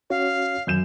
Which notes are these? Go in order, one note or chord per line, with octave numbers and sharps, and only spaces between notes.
C#4 F#4 C#5 F5
F#2 D#3 G6 E7